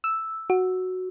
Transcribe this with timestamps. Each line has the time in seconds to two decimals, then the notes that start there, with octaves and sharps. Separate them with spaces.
0.04 E6
0.50 F#4